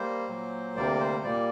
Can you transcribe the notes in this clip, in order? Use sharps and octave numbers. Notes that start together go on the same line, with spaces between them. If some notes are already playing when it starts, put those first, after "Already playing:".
Already playing: G3 A#3 C5
A#2 F#3 A#3
D2 C3 G3 A#3 D5
C5
A#2 G3 A#3 D5